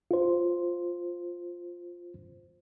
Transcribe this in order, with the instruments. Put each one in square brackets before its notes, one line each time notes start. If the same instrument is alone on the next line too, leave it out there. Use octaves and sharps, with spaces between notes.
[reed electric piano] F4 C5